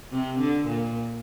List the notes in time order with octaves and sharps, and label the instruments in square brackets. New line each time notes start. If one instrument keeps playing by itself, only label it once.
[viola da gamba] C3
D3
A#2